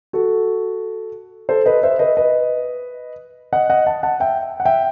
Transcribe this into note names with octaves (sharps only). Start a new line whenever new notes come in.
F#4 A4
A4 C5
B4 D#5
C5 E5
B4 D#5
B4 D#5
D#5 F#5
D#5 F#5
F#5 A5
F#5 A5
E5 G5
F#5
E5 G5